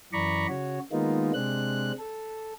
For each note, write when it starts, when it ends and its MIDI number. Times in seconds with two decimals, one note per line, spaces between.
0.13 0.47 42
0.13 0.47 52
0.13 0.47 74
0.13 0.47 82
0.13 0.47 83
0.13 0.47 85
0.48 0.79 49
0.48 0.79 66
0.48 0.79 73
0.92 1.32 51
0.92 1.32 56
0.92 1.32 58
0.92 1.32 59
0.92 1.32 63
0.92 1.32 65
1.34 1.92 48
1.34 1.92 56
1.34 1.92 60
1.34 1.92 62
1.34 1.92 90
1.99 2.53 69